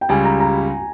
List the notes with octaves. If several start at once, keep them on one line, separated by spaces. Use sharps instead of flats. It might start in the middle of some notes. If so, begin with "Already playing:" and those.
G5
C#2 C#3 G3 G#5
A#5
A#5